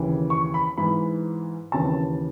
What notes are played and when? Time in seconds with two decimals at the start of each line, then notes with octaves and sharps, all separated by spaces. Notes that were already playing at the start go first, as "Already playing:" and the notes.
Already playing: D#2 C#3 E3
0.30 C#6
0.54 B5
0.78 G#2 E3 B5
1.72 D#2 C#3 E3 A5